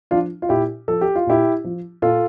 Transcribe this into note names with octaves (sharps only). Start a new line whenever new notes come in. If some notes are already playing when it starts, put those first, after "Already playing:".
F3 D4 F4
F4
A#2 E4 G4
F3 A4
G4
F4
A#2 E4 G4
F3
A#2 F4 A4